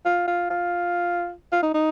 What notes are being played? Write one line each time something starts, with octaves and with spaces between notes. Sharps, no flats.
F4
F4
F4
F4
D#4
D#4